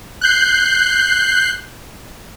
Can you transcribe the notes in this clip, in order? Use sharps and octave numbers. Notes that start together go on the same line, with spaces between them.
F#6 G6 C7